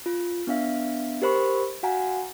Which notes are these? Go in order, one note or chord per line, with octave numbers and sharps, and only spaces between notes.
F4
B3 D4 E5 F5
G4 A#4 C5 B5 C#6
F#4 F5 F#5 G#5 A#5